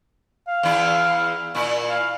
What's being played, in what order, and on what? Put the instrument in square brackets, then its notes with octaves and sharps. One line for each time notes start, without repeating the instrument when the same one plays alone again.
[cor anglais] F5
[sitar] E2 E4
A#2 E4
[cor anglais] F5